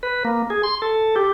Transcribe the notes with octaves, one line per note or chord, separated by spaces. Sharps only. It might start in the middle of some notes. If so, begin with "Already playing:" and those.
B4
A#3
G#4
C6
A4
G4